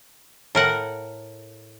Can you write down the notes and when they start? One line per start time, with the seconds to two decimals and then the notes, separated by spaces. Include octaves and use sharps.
0.55 A2 A#4 F#5